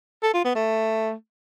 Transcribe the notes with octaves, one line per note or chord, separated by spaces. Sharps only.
A4
F4
B3
A3